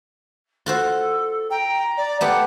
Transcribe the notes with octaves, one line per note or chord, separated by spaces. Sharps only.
F4 F#4 A4 C5
G5 A#5
D5
A3 B3 G4 F#5